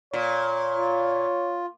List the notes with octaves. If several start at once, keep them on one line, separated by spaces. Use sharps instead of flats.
A#2 C#5
F4